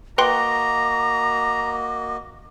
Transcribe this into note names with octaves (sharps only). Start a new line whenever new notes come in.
A#3 F#4 B4 D#5 G5 A#5 C6 D6